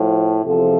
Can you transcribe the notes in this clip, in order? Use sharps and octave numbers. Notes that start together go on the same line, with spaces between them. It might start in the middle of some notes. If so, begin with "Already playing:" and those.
Already playing: A2 F3
E2 C3 F3 F4 A4